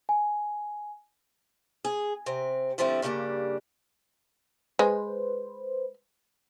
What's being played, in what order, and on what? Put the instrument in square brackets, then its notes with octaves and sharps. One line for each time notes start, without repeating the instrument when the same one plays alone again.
[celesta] G#5
[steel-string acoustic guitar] G#4
C3 C4
D3 F3 G3 A3 C4 E4
G2 C#3 G3 A#3 D4
[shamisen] G#3 [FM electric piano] B4 C5